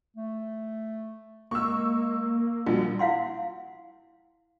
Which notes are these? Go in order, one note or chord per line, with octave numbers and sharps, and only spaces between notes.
A3
G#3 A#3 C#6 E6
A#1 G3 F4 F#4
E4 F5 F#5 C6